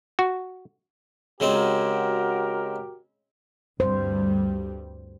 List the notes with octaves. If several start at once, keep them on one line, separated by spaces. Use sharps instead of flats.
F#4
C#3 G#3 C4 F#4 G4 A#4
D2 G2 G3 C5